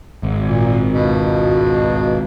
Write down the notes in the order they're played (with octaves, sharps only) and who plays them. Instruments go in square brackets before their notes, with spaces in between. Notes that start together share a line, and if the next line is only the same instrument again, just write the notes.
[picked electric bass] G#1
[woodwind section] A#2
C#2 G2 B2